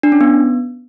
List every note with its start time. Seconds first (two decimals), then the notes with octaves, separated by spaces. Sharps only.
0.03 D4
0.12 C#4
0.21 B3